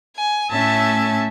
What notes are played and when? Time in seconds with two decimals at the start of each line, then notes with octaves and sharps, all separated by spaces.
0.16 G#5
0.51 A2 A3 C#4 E5 A5 G#6